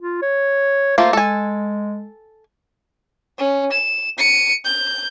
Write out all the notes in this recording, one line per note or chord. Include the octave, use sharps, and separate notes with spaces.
F4
C#5
A3 A#3 F4 C5
G#3 A4 G#5
C#4
E7
C#7 D#7
G6